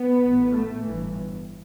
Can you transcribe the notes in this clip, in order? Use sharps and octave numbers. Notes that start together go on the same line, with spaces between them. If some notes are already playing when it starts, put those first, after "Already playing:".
Already playing: B3
A1 A2
A3
G1 G2 E3